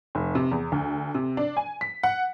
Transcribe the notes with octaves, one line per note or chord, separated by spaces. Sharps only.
F1
C3
E2
D2
C3
D4
G#5
B6
F#5